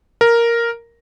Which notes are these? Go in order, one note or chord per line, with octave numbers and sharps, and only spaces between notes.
A#4